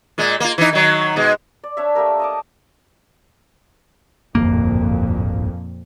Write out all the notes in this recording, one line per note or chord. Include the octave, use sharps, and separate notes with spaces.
A#2 G#3
A#3 F4
E3 D#4
D#3 F#3
B2 G#3
D5
D4 C#5 E5
A3 A#3 G4 A#4
D#5 A5 D6
D1 G1 F2 A#2 A#3